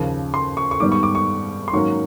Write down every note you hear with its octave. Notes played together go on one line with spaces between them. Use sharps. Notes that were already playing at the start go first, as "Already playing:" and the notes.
Already playing: D#2 C#3 F3
C6
C#6
C#6
G#2 D#3 G3 B3 D6
C#6
D6
C#6
C6
G#2 D#3 F#3 A#3 C#4 C#6